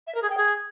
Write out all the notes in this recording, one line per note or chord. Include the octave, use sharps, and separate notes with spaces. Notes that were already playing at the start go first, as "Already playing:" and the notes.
E5
A#4
G#4
G5
G#4